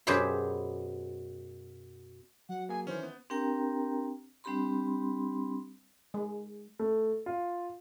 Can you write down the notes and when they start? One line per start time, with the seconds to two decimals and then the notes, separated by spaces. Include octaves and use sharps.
0.07 F#2 B2 G4 G#4 C5 B5
2.49 F#3 F#5
2.69 A#3 G#4 G#5
2.87 D#3 E3 C#4 C5
3.03 B3 G6
3.30 C4 D4 G4 A#4 G5 A#5
4.44 G3 C4 D4 G4 B5 C6
6.14 G#3
6.79 A3
7.26 F4